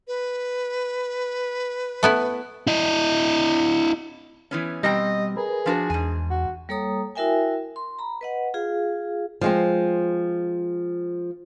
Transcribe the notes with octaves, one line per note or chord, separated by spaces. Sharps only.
B4
A3 B3 E4
E4 D#5
E3 B3 C#4
B2 G3 C4 D#5 G5
G#4 A#4 B4
F3 D4 F#4
E2 G#2 G#5
F#4
G3 A#3 A4 C#5 A#5 D#6
E4 F#4 A#4 E5 G5 G#5
C6
A#5 B5
B4 D#5 F#5
F4 G#4 F5
F3 G#3 C4